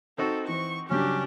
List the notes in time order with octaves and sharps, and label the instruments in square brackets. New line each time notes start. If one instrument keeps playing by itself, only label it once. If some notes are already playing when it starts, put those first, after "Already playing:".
[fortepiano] C4 D#4 F#4 [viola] A4
[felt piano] E3 C5 [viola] C#6
[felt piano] G2 C#3 F#3 [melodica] C#4 [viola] D4 G4